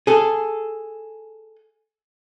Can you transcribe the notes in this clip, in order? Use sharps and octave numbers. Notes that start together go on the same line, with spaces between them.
G#4 A4